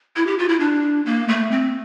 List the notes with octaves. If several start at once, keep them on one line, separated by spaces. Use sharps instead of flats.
E4
G4
F4
E4
D4
A#3
A3
C4